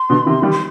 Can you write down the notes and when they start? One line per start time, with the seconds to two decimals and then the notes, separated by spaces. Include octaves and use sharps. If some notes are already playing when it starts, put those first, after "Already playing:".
Already playing: C6
0.10 B2 D3
0.26 C3 D#3
0.42 D#3 G3
0.51 C6